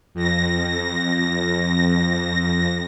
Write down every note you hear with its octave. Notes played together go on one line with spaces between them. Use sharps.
F2 A#6